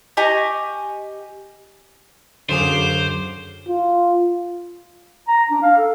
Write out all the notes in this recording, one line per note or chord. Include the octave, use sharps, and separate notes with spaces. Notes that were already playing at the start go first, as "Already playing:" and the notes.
G4 D#5 G#5 C#6
F#2 D3 F#3 G#4 C5 F5 D6
F4
A#5
D4
F5
A4